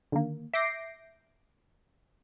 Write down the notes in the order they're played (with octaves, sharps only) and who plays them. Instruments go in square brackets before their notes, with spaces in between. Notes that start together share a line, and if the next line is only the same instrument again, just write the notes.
[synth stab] D3 D#3 A#3
E5 D6 G6 A#6 C7 D7